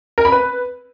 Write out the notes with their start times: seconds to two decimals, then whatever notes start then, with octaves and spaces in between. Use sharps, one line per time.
0.18 A#4
0.25 B5
0.32 B4